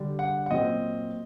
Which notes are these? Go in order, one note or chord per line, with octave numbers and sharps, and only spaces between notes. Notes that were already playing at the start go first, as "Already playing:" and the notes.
Already playing: D3 G3 D4
F#5
F#5
A#2 F#3 C4 D#5